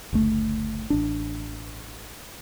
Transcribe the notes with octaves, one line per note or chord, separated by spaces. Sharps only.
F#1 D2 A3
A1 D4